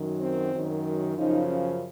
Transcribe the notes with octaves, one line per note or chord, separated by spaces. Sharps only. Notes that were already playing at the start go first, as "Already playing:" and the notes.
Already playing: F#2 D#3 F#3
C4
F#2 D#3 F#3
F#2 C#3 F3 D#4
C#4